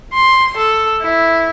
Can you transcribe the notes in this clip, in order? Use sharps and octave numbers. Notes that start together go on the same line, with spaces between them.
C6
A4
E4